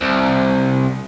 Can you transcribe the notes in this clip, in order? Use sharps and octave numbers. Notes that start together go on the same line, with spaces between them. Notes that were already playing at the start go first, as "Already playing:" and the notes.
C2